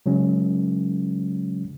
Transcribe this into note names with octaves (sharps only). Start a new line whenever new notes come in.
C#3 F#3 G#3 C#4